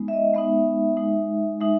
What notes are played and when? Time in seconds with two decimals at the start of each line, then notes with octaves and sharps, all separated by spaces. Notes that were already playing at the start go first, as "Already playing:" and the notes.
Already playing: G#3 B3 D#4
0.08 E5
0.13 D#5
0.34 G#3 B3 D#4 E5
0.97 G#3 D#4
1.60 G#3 D#4 E5